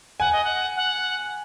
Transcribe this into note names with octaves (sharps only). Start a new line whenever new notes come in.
F#5 G#5
D#5
F#5
F#5